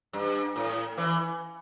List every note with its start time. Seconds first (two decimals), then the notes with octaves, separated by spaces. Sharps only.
0.13 G2
0.56 A2
0.98 E3